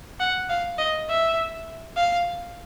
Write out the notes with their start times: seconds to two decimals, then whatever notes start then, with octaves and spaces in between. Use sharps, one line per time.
0.20 F#5
0.49 F5
0.78 D#5
1.09 E5
1.96 F5